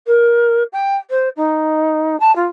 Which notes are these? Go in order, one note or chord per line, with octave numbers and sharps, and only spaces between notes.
A#4
G5
C5
D#4
A5
F4